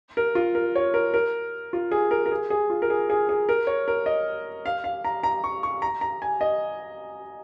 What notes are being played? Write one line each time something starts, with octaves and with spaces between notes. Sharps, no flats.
A#4
F4
A#4
C#5
A#4
A#4
F4
G#4
A#4
A#4
G#4
G#4
F4
A#4
G#4
G#4
G#4
A#4
C#5
A#4
D#5
F5
F5
A#5
A#5
C#6
C#6
A#5
A#5
G#5
D#5